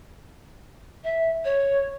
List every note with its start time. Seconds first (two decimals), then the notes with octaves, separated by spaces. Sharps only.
1.04 E5
1.44 C#5